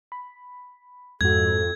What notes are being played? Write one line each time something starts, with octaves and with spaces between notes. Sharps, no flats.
B5
F2 G#2 F#4 A4 G#6